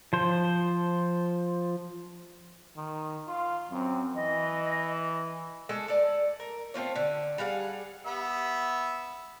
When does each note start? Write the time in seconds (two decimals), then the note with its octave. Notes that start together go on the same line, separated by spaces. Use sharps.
0.13 F3 C5
2.76 D#3
3.27 F4 F5
3.71 F#2 C4
4.15 E3 D#5
5.69 G#3 A3 A4 D#5
5.88 A4 D5
6.40 A#4
6.74 A3 C4 F4 C#5
6.95 D3
7.38 G3 G#4 F5 F#5
8.06 B3 E5